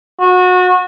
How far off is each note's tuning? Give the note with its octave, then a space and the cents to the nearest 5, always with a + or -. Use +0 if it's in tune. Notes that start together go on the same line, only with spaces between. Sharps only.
F#4 -25